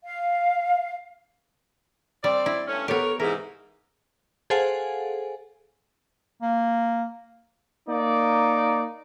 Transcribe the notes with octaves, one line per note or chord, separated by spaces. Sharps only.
F5
G3 C4 D5
E4
G2 A3 C#4
B3 G4 A4 A#4 C#5
A4
G#2 C3 E3 G#4 A#4
G#4 A4 C5 F5 F#5 G#5
A#3
A#3 D#4 D5